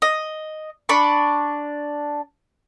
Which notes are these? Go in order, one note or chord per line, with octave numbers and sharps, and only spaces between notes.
D#5
D4 B5 C#6